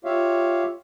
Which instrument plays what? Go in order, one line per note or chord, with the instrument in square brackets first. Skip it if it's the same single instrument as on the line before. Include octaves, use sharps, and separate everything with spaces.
[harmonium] F4 G4 C#5 E5 F5